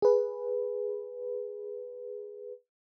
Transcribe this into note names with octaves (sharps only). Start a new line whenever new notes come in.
G#4 B4